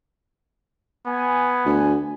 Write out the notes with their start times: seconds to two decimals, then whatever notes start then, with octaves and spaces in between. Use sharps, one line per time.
1.06 B3 G#5
1.66 D2